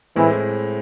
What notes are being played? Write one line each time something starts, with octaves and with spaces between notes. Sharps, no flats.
A2 E3 G#3 C4 E4